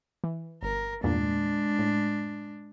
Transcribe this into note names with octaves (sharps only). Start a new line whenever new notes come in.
E3
G1 A#4
E2 G2 A#2 G#3 D4
A2